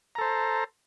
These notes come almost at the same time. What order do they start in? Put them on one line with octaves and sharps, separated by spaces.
A#5 A4 C5